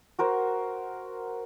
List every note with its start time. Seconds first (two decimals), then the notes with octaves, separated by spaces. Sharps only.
0.19 F#4 A#4 C5